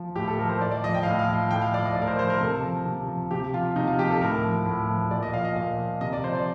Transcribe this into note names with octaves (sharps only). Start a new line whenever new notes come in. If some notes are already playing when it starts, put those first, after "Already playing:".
Already playing: F3
A2 G4
A4
F3 A#4
C5
A2 D5
D5
F3 D#5
G5
A2 F5
D#5
F5
F3
A2 G5
F5
F3 D5
D#5
A2 D5
A#4
C5
F3 C5
A#4
C3 A4
F3
C3
F3
C3 G4
F3 F4
C3 D#4
F4
F3 G4
A4
A2 A#4
F3
A2
F3
A#2 D5
D#5
F3 F5
D#5
A#2 F5
F3
C3 D#5
D5
F3 C5
D5